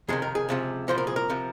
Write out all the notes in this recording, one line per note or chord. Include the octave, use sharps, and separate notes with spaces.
F2 C3 D#3 G#4
A#4
G#4
C#2 C3 F3
C2 A#2 F3 C5
A#4
G#4
A#4
C3 F3